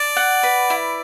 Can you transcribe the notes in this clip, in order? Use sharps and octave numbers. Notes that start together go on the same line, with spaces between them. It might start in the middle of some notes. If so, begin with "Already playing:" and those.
Already playing: D5 A5
F#5
B4
E4